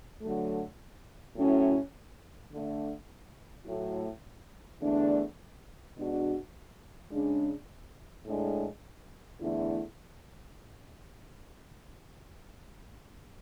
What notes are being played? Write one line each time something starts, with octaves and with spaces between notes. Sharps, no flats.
D3 F#3 A3
A2 F#3 C#4 E4
D3 A3 D4
A2 F#3 A3 E4
E2 D3 A3 D4
B2 G#3 D4 F#4
C#3 G#3 D4
A2 G#3 D4
E2 D3 A3 E4